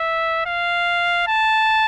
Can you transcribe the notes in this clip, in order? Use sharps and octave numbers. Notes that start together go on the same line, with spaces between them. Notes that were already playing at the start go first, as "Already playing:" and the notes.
Already playing: E5
F5
A5